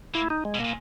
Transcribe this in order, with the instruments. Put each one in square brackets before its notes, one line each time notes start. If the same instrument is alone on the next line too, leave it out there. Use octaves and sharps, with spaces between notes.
[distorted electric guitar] A#3 [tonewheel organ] E4
[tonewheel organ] D#4
G#3
[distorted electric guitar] B2
[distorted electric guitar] A#2 [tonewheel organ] A#3